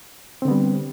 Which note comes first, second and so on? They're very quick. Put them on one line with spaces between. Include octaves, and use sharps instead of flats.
C4 D3 B3 G3